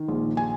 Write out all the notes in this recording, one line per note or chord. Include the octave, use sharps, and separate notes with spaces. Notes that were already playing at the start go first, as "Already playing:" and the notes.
Already playing: D#3
A#1
G#5